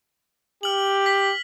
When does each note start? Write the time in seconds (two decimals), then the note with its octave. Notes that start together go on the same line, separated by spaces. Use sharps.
0.63 G4 F6 F#7
1.06 B6